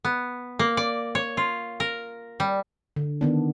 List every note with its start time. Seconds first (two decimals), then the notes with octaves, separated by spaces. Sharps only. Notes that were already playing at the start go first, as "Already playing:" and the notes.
0.05 B3
0.59 A#3
0.77 D5
1.15 C#5
1.37 F4
1.80 A#4
2.40 G3
2.96 D3
3.21 D#3 B3 D4